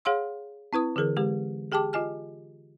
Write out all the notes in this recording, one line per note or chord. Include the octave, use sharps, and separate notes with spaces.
G#4 C#5 F5 F#5 C6 E6
C4 E4 B4 D#6
D3 E3 G#4 A#4
D3 G#3 G4
G4 G#4 G5 A5 D6
F4 D#5 G#5 F6